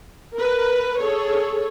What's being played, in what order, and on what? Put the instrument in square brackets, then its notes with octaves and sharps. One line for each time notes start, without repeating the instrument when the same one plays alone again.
[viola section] A#4 B4
G#4 A4 C#5